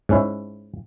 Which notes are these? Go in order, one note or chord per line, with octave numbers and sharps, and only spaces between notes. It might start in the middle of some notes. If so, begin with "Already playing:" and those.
G#2 C#4 E4